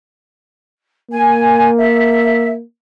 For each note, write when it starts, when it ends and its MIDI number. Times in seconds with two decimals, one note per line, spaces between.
1.11 2.62 58
1.11 1.70 80
1.77 2.49 76